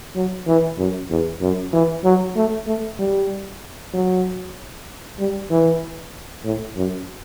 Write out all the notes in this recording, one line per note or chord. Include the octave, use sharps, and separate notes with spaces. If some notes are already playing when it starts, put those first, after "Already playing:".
F#3
E3
F#2
E2
F#2
E3
F#3
A3
A3
G3
F#3
G3
E3
A2
F#2